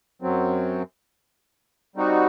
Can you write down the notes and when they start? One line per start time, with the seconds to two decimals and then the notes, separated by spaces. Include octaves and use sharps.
0.22 F#2 F#3 C4
1.96 G3 C4 D#4 F#4